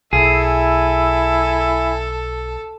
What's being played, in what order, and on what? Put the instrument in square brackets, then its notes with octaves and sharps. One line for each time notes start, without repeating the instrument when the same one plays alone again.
[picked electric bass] B1 [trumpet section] E4 G#5 [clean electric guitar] G#4 [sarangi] A4